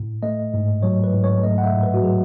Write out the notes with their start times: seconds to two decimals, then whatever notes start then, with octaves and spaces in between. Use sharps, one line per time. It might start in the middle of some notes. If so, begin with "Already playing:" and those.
Already playing: A2
0.23 A3 D#5
0.54 G#2
0.83 F#3 C#5
1.04 B4
1.13 G#2
1.24 C#5
1.43 A3 D#5
1.58 F#5
1.63 E5
1.73 A2
1.83 B4
1.94 F#4
2.03 F#3 G#4